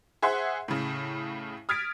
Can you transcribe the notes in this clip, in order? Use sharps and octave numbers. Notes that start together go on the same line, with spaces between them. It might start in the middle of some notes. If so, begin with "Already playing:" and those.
G#4 C5 E5 F#5 C6
A2 C#3
D#6 F6 G#6 A6 B6 D7